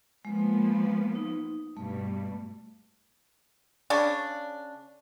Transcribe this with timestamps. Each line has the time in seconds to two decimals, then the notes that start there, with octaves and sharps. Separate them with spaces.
0.25 F3 G#3 A#3 B3
1.15 D#4
1.77 G2 B2 G3 A3
3.90 C#3 C#4 D4